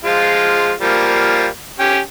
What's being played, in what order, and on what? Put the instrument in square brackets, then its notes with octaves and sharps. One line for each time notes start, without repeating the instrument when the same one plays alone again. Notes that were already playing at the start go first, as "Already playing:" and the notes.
[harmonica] F3 G#3 F4
F3 G3 A#3
C#4 G4 G5